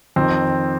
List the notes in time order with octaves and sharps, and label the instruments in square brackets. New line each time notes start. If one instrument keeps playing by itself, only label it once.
[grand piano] F2 D#3 C4